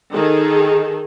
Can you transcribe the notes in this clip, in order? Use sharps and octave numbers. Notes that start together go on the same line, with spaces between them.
D#3 G#4 A4